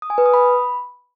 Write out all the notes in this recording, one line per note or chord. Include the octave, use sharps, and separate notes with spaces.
D#6
G#5
B4
D#6
B5